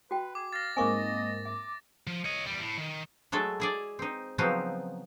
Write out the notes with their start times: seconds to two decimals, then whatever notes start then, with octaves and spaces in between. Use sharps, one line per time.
0.11 F#4 B4 G5
0.35 G#4 D6
0.53 F5 A6 A#6
0.77 G#2 A#3 C4 D#5 G#5 C#6 D6
1.45 E5 D6
2.07 F3
2.25 C#5 D#5
2.46 E2 G3
2.61 A2
2.78 D#3
3.32 F#3 G#3 A3 A4 E5
3.60 E4 G#4 D5
3.99 C4 D#4
4.38 C#3 F3 F#3 B3 C4 D#4